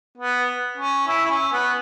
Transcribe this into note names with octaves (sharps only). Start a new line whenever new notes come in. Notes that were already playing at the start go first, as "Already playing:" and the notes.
B3
C#4
E4
E4
C#4
B3